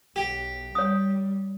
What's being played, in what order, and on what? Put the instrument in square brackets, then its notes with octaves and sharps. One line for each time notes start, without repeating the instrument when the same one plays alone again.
[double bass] B1 [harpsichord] G4
[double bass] G3 [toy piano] C#5 D#6